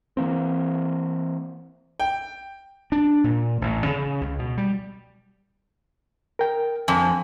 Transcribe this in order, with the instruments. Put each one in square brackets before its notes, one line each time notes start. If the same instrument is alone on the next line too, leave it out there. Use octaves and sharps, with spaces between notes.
[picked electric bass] E3 A#3 C4
[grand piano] G5
[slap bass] D4
A#2
A1
C#3
C#2
B2
G3
[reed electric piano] A#4 G5
[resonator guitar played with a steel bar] F2 [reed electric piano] G#5